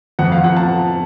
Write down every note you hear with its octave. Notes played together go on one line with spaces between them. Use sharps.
F2 F#5
F5
F3 F#5
A5